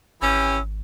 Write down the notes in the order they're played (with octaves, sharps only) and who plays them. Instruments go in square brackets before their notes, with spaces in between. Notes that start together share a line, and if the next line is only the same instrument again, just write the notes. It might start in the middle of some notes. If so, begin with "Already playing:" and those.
[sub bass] G#1 [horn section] E3 C#4 G4 [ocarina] E6